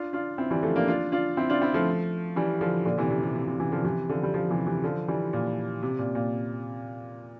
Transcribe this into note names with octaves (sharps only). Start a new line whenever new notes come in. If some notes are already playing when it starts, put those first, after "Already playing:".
Already playing: D4 F4
D4 F4
C4 E4
E3 G3
F3 A3
A#3 D4
D4 F4
D4 F4
C4 E4
D4 F4
C4 E4
F3 A3
E3 G3
D3 F3
A#2 D3
C3 E3
C3
C3
C3
C3
C3 E3
D3 F3
C3 E3
D3 F3
G3
D3 F3
C3 E3
C3 E3
D3 F3
E3 G3
A#2
C3
A#2
A#2